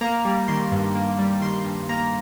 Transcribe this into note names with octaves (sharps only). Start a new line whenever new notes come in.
A#3 A#5
G3
D#3 C6
G2
A#3
G3
D#3 C6
G2
A#3 A#5